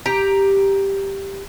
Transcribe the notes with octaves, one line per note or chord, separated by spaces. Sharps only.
G4 A#5